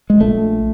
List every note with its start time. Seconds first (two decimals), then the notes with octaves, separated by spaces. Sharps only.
0.10 G#3
0.21 A#1 A3